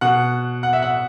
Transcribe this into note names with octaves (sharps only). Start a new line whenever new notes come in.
B2 F#5
F#5
E5
F#5